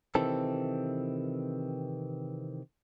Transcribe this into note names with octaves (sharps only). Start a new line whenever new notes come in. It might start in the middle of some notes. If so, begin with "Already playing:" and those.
C3 D#3 E3 C4 A4